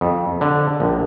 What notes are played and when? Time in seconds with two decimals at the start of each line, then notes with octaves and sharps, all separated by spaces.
0.01 F2
0.41 D3
0.80 A#1